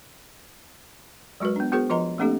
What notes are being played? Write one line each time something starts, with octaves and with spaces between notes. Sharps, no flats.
F#3 G#3 F#4 A#4 B4
B3 D4
B3 F#4 G#4 A#4 C5
F3 F4 B4 D#5 A#5 C6
A3 A#3 C4 D4 G4 A4